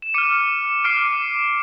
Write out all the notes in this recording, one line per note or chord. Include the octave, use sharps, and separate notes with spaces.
E7
D6 F6 C#7 D#7
D6 F6 C7 D7